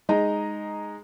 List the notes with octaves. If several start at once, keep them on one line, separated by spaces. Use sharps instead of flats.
G#3 D#4 D#5 A#5